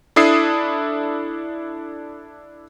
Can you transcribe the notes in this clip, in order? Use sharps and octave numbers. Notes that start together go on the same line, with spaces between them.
D4 E4 A4 D#6 C7